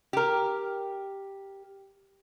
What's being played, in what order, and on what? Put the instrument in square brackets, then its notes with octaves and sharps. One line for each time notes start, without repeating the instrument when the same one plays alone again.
[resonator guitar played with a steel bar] G4 A#4